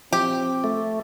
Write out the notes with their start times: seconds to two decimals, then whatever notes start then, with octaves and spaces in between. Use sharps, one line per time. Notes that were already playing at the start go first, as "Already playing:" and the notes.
0.13 F3 C4 G4
0.64 A3